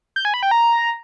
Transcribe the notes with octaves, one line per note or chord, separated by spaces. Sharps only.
G6
G#5
B5
G5
A#5